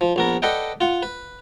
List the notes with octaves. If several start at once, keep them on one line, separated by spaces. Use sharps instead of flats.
F3
A#1 B3 A#4
A4 B4 D5 D#5 F#5 G5
F4 F#5
B4